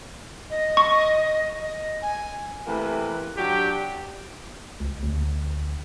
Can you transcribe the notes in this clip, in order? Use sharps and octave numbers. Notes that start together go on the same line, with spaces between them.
D#5
C#6
D#5
G#5
C3 E3 A3 A#3 B4
F#3 D4 F#4 G4
C#2
D2